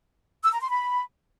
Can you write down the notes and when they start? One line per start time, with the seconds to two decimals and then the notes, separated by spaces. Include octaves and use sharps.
0.44 E6
0.52 A#5
0.61 C6
0.69 B5